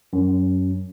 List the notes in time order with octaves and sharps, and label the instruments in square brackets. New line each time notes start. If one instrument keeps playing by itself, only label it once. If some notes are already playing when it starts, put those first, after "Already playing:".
[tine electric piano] F#2